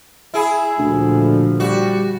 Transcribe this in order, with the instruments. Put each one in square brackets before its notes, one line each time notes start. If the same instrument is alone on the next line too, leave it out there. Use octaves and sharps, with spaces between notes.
[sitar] E4 G#4
[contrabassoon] D2 [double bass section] A#2 D3 F3
[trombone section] G3 [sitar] F#4